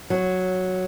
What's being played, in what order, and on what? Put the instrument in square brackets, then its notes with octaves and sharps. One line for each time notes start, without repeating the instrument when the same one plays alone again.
[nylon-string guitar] F#3